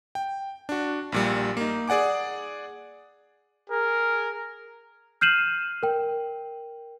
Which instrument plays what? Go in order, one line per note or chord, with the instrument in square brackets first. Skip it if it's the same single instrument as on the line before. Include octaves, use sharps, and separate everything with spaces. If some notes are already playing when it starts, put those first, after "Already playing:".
[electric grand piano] G5
D4 F#4
A#1 A#2 G3
A#3 D#4
G#4 D5 F#5 G#5 D6
[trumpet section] G#4 A#4
[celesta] F6 G6 C7 D#7 E7 F#7
A#4 G5